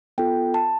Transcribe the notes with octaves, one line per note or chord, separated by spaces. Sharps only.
B3 F4 A4 G5
A5